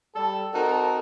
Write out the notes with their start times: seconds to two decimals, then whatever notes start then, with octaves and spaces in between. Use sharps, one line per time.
0.15 G3 A4
0.54 C4 D#4 F#4 A4 A#4